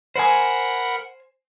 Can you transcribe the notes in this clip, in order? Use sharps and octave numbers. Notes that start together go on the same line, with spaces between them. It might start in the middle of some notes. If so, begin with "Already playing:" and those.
A#4 C5 F#5 G#5 B5